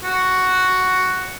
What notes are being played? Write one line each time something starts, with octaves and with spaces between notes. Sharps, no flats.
F#4